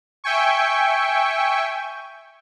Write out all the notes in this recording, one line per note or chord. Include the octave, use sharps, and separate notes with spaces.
E5 G5 G#5 C#6